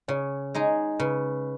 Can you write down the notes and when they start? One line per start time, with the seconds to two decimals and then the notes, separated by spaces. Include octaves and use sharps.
0.08 C#3 C#5
0.54 G#3 D#4 G#4
0.99 C#3 B4